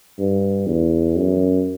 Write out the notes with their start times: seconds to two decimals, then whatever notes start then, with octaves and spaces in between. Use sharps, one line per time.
0.19 G2
0.67 E2
1.16 F#2